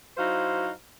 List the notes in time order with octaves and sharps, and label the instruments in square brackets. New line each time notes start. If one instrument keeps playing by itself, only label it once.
[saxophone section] F#3 D#4 E4 F#4 C5 F5